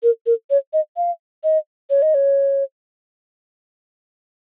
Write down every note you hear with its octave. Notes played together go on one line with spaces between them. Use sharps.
A#4
A#4
C#5
D#5
F5
D#5
C#5
D#5
C#5